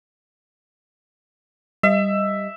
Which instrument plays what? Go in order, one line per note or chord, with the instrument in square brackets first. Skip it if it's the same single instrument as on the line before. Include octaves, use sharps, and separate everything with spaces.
[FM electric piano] G3 D#5 [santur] E5